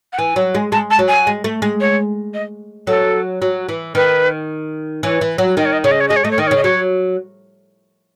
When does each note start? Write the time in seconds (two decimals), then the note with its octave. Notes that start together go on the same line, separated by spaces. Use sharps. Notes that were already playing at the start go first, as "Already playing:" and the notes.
0.13 F#5
0.19 E3 G#5
0.36 F#3
0.55 G#3
0.72 G#3 A5
0.91 A5
0.99 F#3
1.08 G#5
1.27 G#3
1.44 A3
1.62 G#3
1.81 C#5
2.34 D#5
2.87 F#3 A4
3.42 F#3
3.69 E3
3.95 D#3 B4
5.03 E3 C#5
5.21 E3
5.38 F#3
5.57 D#3 D#5
5.65 C#5
5.72 D#5
5.84 C#3 C#5
5.91 D#5
6.00 C#5
6.08 G#3 D#5
6.16 C#5
6.24 A3 D#5
6.31 C#5
6.38 D#3 D#5
6.47 C#5
6.51 C#3
6.56 D#5
6.64 F#3 C#5